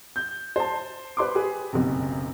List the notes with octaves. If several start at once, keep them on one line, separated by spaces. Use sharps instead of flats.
G6
C5 A5
B4 C5 C6 D6
G4 G#4 B4
F#1 B1 C3